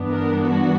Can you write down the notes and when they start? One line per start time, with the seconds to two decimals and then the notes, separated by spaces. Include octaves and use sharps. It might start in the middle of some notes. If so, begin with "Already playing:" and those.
Already playing: G2 E3 B3 D4
0.09 A#4
0.45 F#4